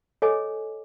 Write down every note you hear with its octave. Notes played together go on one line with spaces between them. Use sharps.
A4 C#5 D#5 G#5 D6